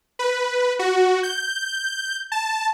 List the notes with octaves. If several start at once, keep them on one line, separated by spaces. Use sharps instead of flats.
B4
F#4
G6
A5